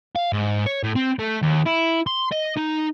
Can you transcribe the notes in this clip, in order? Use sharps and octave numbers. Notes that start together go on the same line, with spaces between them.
F5
G#2
C#5
A2
C4
A3
D#2
E4
C6
D#5
D#4